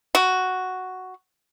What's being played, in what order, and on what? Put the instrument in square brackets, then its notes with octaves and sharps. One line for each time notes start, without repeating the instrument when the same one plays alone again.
[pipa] F#4